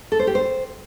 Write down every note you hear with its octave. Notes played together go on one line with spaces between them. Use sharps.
A4
C5
G4
C5